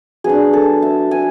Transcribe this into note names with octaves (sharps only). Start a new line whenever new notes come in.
F#3 B3 D4 G#4
A4
E5
G#5